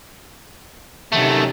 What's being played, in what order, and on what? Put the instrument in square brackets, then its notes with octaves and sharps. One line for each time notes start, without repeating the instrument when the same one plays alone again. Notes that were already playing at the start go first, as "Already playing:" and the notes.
[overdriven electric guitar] F#2 A3 [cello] C3 D#3